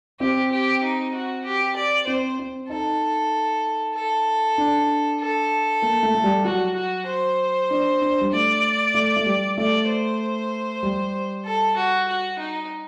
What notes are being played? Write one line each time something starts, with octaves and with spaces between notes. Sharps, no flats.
C4 G4
G4
D#4
F#4
G4
D5
C4 C5
C4
D#4 A4
A4
D4
A4
A#3
A3
A3
G3
F#3 F#4
F#4
C5
D4
D4
G3
A3 D5
A3
A3
G3
A3 D5
C5
G3
A4
F#4
F#4
D#4